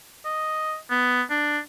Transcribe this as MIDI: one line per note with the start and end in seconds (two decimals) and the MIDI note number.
0.25 0.76 75
0.90 1.22 59
1.30 1.59 62